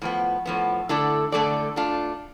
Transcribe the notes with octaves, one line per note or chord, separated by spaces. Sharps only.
A2 F3 B3
A2 F3 B3
D3 A3 E4 A4 D5
D3 A3 E4 A4 D5
A3 D4 F4